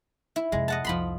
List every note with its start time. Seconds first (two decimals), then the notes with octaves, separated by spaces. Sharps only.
0.36 E4
0.52 F2 C3 G#3
0.68 D#5 F#5 A5
0.85 C2 F2 F3 B5 C6